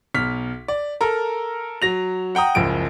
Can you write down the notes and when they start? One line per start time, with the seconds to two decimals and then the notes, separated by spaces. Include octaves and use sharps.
0.15 B1 F6 B6
0.68 D5
1.01 A4 A#4 A#5
1.82 F#3 A#6 F7
2.35 F#5 G5 A#5 D#6
2.55 F#1 C#2 F3 D7